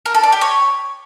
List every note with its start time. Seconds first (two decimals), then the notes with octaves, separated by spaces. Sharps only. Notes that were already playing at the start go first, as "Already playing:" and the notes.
0.06 A#4
0.15 A4
0.23 D5
0.32 G4
0.41 C#5